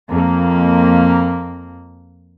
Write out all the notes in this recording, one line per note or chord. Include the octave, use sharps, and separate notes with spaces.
F2 A#3